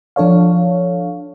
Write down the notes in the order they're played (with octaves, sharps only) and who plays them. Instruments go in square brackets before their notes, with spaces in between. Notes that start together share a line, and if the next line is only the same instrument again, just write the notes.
[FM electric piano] F3 D4 A4 C#5 F5